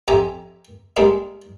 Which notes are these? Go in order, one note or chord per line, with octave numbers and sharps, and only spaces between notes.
F2 G4 E5 G#5 A#5
G3 G#3 A#3 D4 D#4